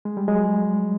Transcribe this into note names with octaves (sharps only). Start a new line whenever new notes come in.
G#3
G3
F#3 G#3